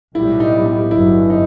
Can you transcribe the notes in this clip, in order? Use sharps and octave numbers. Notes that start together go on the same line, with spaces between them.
B1 A2 G3 B3 E4
D#4
D#4
G1 G2 F#3 E4
D#4